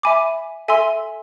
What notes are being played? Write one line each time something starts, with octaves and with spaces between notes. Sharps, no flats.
E5 G#5 B5 D6
A4 E5 G#5 C6 E6